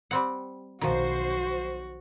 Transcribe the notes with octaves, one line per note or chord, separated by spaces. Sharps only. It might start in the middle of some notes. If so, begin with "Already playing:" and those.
G3 C4 F#5
B1 D#3 F3 F#4 C5